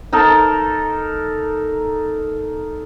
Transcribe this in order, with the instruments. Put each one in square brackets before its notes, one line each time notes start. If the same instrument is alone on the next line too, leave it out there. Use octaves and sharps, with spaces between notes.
[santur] D#4 A4 A#4 A5